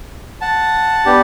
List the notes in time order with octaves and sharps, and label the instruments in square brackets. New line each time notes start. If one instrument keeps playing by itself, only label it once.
[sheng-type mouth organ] F#5 A5
B3 D4 G4